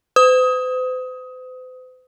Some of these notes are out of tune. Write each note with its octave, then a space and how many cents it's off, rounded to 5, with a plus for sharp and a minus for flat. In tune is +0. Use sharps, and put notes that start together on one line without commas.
C5 -45 D#6 +20